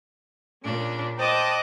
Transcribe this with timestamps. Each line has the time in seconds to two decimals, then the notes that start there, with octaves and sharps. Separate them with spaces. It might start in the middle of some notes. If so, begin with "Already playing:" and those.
0.63 A#2 C#3 D4
1.19 C5 D#5 G5 A5 D6 F#6